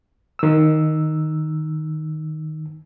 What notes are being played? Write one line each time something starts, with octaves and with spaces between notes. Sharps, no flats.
D#3 E6